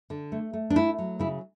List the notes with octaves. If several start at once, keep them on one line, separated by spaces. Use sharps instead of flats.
D3
A3
A3
D4
A3 E4
F#3
C#3 E4